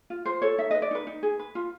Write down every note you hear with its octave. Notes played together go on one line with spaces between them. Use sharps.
F4
F4 C5
A4 C#5
D#4 E5
B4 D#5
D5
D#4 B4
D#4
G#4
B4
F4